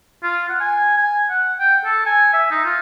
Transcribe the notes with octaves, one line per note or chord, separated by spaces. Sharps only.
F4
F#5
G#5
G#5
F#5
G5
A4
G#5
E5
D#4
F4